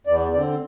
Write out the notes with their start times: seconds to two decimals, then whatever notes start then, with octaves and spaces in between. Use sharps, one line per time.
0.07 E2 D5
0.33 D3 C4 D5